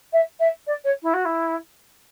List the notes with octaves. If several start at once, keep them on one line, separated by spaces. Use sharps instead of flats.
E5
E5
D5
C#5
E4
F#4
E4